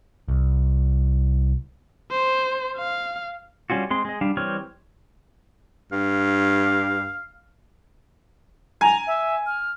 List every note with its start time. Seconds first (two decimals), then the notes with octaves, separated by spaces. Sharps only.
0.28 C2
2.11 C5
2.77 F5
3.70 G3 C#4 F4 F#4
3.90 G#3 C4 C6
4.05 G#3 D#5
4.21 G3 D4 F5
4.37 E3 G3 C4 C#5 F6
5.92 G2 F5
8.81 G#5 A#5
9.07 E5
9.46 F6